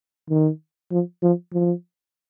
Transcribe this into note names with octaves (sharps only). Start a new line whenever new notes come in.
D#3
F3
F3
F3